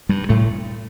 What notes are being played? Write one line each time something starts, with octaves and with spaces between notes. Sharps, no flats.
G2 G3
A2 A3